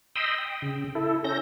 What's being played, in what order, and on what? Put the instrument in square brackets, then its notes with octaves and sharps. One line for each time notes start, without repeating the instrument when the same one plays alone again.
[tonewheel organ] D#5 G5 B5 C6 D#6 E6
G5
C#3
E4 A4
C#4 A4 G6 A#6